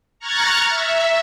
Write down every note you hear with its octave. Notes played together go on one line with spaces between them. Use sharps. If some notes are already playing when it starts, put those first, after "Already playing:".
A#5 C#6 F6 F#6 G#6 A6
E5